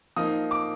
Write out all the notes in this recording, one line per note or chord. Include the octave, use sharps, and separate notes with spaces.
F3 A#3 D#4 D#6
D6